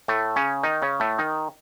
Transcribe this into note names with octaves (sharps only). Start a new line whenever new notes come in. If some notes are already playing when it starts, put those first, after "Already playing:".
A2 A3
C#3 C#4
D#3 D#4
C#3 C#4
A2 A3
D#3 D#4